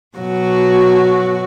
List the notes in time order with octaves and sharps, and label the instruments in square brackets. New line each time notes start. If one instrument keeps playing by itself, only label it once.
[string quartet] B2 F#3 F#4